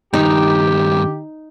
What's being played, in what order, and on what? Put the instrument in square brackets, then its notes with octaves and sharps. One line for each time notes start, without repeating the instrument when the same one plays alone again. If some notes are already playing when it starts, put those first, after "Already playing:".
[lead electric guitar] G2 D#3 [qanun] D#4 [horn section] G4